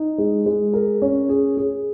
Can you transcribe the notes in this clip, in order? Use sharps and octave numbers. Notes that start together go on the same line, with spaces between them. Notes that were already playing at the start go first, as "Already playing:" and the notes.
Already playing: D#4
G#3
G#3
A#4
C#4
G#4
G#4